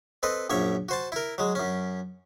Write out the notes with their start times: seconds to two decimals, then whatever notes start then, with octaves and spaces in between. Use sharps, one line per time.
0.23 C4 A4 B4 D#5
0.50 A#1 F#2 C#5 E5
0.89 F#4 C5 A5
1.12 E4 A#4
1.38 F#3 G#3
1.55 F#2 C#4